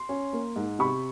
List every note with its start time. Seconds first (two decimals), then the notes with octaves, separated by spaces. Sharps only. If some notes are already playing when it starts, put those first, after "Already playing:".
Already playing: C6
0.09 C#4
0.33 A#3
0.56 G#2
0.79 C3 B5 C#6